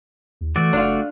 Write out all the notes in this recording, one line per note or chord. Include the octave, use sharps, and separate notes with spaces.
D#2
E3 A3 F#4 D5
F#1 D4 F4